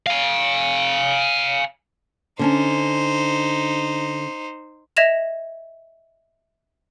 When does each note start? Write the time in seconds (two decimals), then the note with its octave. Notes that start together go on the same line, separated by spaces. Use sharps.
0.07 F5 G#5
2.39 D3 C#4 D#4 C5 A5
4.97 D#5 E5 G#6 A#6 E7 F7